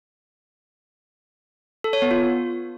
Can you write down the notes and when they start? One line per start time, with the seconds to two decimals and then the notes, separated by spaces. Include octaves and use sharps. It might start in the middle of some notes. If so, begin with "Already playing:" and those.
1.84 A4
1.93 C#5
2.02 B3
2.11 F4